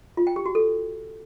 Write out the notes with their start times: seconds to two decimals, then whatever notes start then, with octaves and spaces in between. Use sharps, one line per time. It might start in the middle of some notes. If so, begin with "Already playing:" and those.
0.17 F4
0.27 G5
0.36 G4
0.46 F#4
0.55 A4